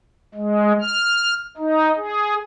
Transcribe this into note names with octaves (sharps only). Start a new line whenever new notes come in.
G#3
F6
D#4
G#4